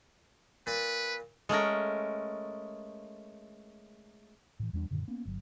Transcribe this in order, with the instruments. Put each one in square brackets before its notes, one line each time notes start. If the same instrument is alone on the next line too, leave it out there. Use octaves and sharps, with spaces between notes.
[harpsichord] A#2 [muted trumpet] B4
[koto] G#3 A3 C#4 A#4
[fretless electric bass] A2 E3
E2 G3 A#3 D4
F#2 A#2 D3 D#3
A#3 B3 C#4
G1 F#3